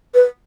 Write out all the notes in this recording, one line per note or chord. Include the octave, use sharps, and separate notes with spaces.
B4